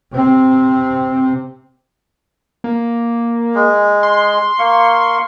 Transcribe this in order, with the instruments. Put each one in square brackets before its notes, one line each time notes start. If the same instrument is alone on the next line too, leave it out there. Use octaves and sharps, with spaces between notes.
[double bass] C3 C4
[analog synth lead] A#3
[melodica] G#3
[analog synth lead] C6
[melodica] A#3 C#6